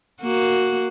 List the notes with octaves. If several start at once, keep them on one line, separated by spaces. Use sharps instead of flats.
A#3 F#4